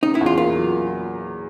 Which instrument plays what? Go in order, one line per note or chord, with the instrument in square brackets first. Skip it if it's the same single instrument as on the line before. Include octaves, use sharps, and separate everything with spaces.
[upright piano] C#3 [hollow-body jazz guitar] D#4
[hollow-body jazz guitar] E4
[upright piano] E2
[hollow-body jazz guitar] F4
[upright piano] A#3 [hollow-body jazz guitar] F4
[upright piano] F#3